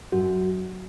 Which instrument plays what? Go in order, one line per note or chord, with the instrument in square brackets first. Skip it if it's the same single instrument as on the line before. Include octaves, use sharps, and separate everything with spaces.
[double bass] F#2 [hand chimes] F#4